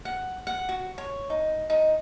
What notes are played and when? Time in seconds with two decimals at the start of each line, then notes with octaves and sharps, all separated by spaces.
0.05 F#5
0.47 F#5
0.69 F#4
0.98 C#5
1.30 D#4
1.70 D#4